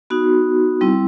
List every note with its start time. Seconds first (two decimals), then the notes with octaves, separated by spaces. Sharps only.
0.10 B3 D#4 F#4
0.81 G3 C4 E4